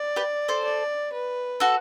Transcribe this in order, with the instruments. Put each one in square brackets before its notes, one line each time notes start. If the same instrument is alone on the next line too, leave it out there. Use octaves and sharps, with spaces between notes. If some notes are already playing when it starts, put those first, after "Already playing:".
Already playing: [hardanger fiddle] D5
[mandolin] G4 B4
A4 C5
[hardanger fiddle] D5
B4
[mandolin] F#4 A4